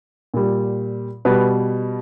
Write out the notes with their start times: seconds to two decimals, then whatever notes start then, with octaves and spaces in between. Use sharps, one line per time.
0.34 A#2 G3
1.25 B2 G3 B4